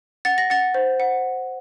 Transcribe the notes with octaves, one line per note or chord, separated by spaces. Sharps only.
F#5 A6
A#6
F#5 A6
C5
F#5